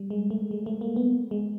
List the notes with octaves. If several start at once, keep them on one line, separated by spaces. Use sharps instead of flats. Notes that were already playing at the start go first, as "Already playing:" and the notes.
Already playing: G3
G#3
A3
G#3
A3
A#3
B3
G#3